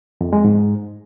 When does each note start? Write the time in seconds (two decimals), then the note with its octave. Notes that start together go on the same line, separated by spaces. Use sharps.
0.21 F2
0.33 G#3
0.45 G#2